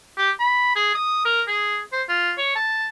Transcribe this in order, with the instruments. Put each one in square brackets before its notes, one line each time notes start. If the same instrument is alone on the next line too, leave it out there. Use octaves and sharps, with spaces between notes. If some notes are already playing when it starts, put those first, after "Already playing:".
[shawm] G4
B5
G#4
D#6
A#4
G#4
C5
F4
C#5
A5